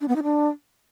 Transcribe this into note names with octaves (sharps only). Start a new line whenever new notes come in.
D4
B3
D#4
D4